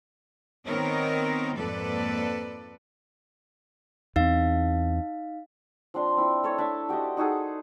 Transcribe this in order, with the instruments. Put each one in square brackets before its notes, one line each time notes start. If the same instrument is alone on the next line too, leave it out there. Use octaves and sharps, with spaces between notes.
[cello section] D#3 B3 C4 D#4 A#4 C#5
F2 G#2 A#3 A4 B4 D5
[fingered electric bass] E2 C4 [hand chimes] D#4 F5
[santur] F3 C4 D4 C6
C4 E4
A3 A4 C#5
D4 E5 A5
F#4 G4 C5 D#5
D#4 F#4 G#4 A4